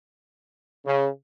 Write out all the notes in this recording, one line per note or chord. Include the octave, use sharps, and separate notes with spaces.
C#3